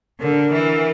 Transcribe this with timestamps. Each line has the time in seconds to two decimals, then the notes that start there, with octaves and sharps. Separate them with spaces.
0.20 D3 A#4
0.53 E3